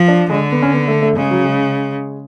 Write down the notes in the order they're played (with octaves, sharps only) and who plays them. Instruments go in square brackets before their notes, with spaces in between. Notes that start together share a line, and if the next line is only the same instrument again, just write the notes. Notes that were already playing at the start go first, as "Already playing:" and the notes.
Already playing: [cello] F3
[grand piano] D4
[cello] D3 [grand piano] G#3
[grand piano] B3
C#4
B3
A3
A3
[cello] C#3 [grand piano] G#3
[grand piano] F#3
G#3